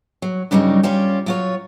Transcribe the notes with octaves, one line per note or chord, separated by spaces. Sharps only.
F#3
G2 C#3 F#3 G3 C#4 D#4
G3 C#4 F4 G4
F#3 F4 C#5